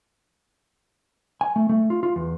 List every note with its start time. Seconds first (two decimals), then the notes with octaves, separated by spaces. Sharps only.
1.41 G#5
1.56 A3
1.69 A3
1.90 F4
2.03 F4
2.16 E2